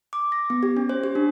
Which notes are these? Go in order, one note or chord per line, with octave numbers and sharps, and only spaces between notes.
D6
A#6
B3
G4
C#4
C5
G4
D4